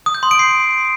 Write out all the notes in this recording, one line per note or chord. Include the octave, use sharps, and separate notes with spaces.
D#6
G6
C6
D7
C7